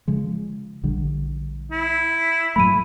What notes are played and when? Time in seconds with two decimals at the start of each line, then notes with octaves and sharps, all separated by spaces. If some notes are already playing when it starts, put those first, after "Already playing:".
0.08 C#3 F3 G#3
0.83 A#1 D3 G3
1.72 E4
2.56 G#2 F#3 A3 B5 D#7